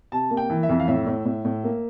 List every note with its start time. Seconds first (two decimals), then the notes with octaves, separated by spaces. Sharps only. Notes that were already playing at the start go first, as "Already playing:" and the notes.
0.12 C3 A5
0.31 A#3
0.37 G5
0.50 E3
0.63 E5
0.69 F2
0.80 F5
0.88 A2 E5
1.07 A2
1.25 A2
1.45 A2
1.64 A#3